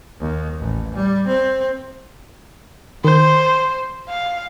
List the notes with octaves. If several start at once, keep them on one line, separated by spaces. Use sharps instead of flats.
D#2
A1
G3
C4
D#3 C5 G6
F5